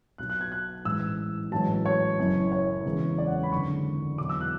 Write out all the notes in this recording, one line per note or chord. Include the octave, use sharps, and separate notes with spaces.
B1 B2 F#3 F#6
F#6
G#6
F#6
A1 G#2 E3 E6
A1 G#2 F#3 A5
C#5
F#1 F#2 E3
C#5
E1 E2 C#3
D5
F#5
B5
G#1 F#2 D3 C#6
E2 B2 F#3 D6
E6
F#6